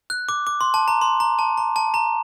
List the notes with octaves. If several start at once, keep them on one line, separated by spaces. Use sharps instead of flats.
F#6
D6
D6
C6
A5
A#5
C6
A#5
A5
A#5
A5
A#5